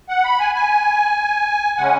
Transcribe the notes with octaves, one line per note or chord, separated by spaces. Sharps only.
F#5
B5
G#5
G#5
C#3 G#3 C#4 F#5